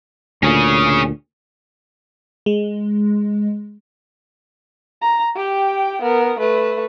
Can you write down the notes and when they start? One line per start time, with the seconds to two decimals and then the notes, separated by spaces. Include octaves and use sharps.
0.43 D2 A#2 C#4 G#4
2.46 G#3
5.01 A#5
5.36 G4 G5
6.02 B3 A#4
6.39 A3 B4